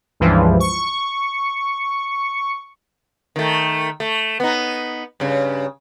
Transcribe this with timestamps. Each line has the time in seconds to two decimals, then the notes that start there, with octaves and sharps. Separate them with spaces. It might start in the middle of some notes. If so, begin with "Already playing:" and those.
0.20 C#2 G2 E3 F3
0.60 C#6
3.36 D#3 A3
4.00 A3
4.40 B3 D#4
5.20 G2 C#3